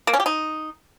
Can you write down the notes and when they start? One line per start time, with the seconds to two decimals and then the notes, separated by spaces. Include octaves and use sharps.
0.07 A#3
0.13 C#4
0.20 G4
0.26 D#4